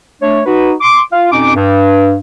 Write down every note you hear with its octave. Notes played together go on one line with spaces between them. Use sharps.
A3 D4 C#5
D#4 F#4 B4
C6 D6
F4 F5
F2 B2 C#4 D#4 D6
G2